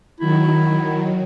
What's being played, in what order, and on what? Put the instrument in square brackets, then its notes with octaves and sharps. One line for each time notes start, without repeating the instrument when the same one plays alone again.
[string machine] D#3 F#3 [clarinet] E4